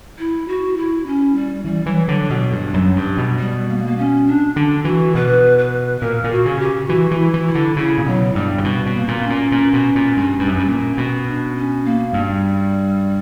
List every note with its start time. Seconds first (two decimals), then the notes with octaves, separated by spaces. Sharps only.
0.19 E4
0.48 F#4
0.77 E4
1.06 C#4
1.36 G3
1.64 E3 G3
1.86 E3 F#3
2.08 D3 F#3
2.30 B2 F#3
2.52 G2
2.74 F#2
2.96 G2
3.17 B2
3.39 G3
3.68 A#3
3.77 G3
3.86 A#3
3.97 C#4
4.27 D4
4.56 D3 D4
4.85 E3 F#4
5.15 B2 B4
5.58 B4
6.01 A#2 A#4
6.24 A#2
6.31 F#4
6.45 C#3
6.60 G4
6.89 E3 F#4
7.11 E3
7.18 E4
7.34 E3
7.47 E4
7.55 D3
7.76 C#3 E4
7.98 A#2
8.06 B2 F#3
8.35 G2 G3
8.58 C#3
8.64 B2 G3
8.86 B2
8.94 A#3
9.08 A#2
9.23 C#4
9.30 A#2
9.52 A#2
9.73 B2
9.95 A#2
10.17 G2
10.39 G2
10.48 F#2
10.58 G2
10.68 A#2
10.97 B2
11.26 D4
11.56 C#4
11.85 A#3
12.13 G2 G3